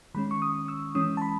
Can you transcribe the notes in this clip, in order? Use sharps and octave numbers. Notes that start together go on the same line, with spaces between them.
D#3 G#3 C#4 B5
C#6
D#6
E6
E3 G#3 C#4 D#6
A5
B5